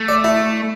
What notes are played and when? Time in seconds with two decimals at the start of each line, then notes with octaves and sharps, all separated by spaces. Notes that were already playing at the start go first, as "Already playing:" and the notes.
Already playing: A3
0.08 D5
0.24 E4